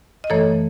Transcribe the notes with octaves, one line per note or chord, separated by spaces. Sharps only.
D#5
F#2 E3 A3 A4 C#5